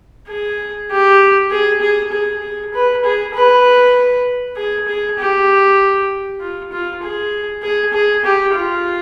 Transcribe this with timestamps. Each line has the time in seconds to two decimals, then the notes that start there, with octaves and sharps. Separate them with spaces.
0.29 G#4
0.91 G4
1.51 G#4
1.81 G#4
2.12 G#4
2.42 G#4
2.74 B4
3.04 G#4
3.34 B4
4.57 G#4
4.88 G#4
5.19 G4
6.41 F4
6.72 F4
7.02 G#4
7.62 G#4
7.93 G#4
8.25 G4
8.54 F4